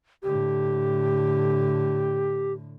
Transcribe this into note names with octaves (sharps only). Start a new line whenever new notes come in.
A2 D3 G4